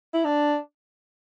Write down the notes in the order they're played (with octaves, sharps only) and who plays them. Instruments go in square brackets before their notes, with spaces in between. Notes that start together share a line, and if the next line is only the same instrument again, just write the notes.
[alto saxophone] E4
D4